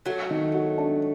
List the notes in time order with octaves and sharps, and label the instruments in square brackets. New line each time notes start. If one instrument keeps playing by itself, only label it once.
[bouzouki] F#3 A3 [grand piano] F#4
[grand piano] D#3
F#4
D4